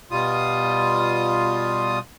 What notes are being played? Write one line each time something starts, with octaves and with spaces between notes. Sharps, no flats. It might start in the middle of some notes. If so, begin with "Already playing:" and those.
B2 G3 F4 D#6